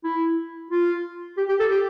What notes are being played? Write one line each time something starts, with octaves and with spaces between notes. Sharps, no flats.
E4
F4
G4
G4
A4
G4